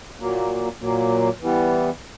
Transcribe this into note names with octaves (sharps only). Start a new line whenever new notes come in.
A#2 F#3 A#3
A#2 F#3 A#3
E3 G3 B3